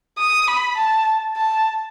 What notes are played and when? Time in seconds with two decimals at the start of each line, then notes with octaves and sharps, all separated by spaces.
0.19 D#6
0.48 B5
0.78 A5
1.36 A5